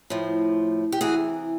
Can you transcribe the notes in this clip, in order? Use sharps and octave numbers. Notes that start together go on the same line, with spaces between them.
A2 F3
G4
C3 E3 F#4 G#4